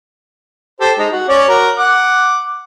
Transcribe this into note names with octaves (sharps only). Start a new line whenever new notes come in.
G4 A4 C5
G#3 D#4
F#4
C#4 C#5 D5
F#4 A#4
F#5 D6